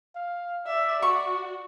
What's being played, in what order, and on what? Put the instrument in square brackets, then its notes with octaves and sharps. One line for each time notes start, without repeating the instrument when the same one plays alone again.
[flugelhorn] F5
[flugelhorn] D5 [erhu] E5
[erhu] F#4 [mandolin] C#6